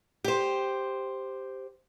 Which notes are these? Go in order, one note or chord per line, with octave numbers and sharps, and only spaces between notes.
G4 C5